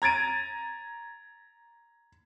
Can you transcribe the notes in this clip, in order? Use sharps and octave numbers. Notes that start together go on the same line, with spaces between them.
A#5 G#6 A6 D7 D#7